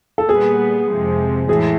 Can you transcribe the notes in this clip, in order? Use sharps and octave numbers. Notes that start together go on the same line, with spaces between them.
A4
A#2 G3 B3 G#4
F2 C3 F3 G#3
A2 E3 G#4